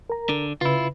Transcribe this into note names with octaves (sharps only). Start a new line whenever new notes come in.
A#4 A#5
D3
C#3 E4 F4 B4